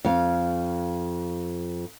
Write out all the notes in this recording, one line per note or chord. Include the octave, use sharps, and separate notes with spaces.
F2 F5